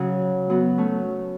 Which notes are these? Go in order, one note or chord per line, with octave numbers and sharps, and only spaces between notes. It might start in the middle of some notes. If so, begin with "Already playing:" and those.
Already playing: C#3 F#3
F#3 B3
A3 C#4